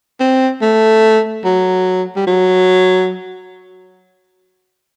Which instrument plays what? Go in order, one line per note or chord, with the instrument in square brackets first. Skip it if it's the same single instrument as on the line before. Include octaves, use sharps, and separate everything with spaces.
[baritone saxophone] C4
A3
F#3
G3
F#3